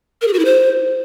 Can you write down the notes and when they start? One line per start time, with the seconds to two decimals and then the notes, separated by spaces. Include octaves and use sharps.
0.22 A#4
0.27 G#4
0.33 F#4
0.39 E4
0.45 C5